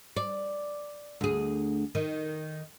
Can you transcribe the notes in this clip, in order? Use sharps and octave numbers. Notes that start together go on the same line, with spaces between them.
D5
D2 G#4
D#3